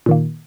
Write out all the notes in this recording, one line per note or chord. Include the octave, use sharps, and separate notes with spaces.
A#2 D#3 A#3